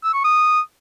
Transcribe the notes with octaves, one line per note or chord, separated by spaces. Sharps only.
E6
C#6
D#6